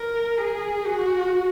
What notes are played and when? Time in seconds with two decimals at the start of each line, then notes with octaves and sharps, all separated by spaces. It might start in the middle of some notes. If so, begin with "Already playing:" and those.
Already playing: A#4
0.38 G#4
0.86 F#4